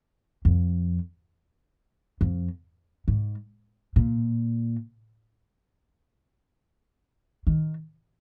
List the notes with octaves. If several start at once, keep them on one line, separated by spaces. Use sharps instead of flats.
F2
F2
G#2
A#2
D#3